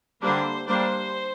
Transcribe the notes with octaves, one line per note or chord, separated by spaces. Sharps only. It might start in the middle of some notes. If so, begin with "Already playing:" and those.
D3 G3 A#3 D4 C5
G3 A#3 D4 C5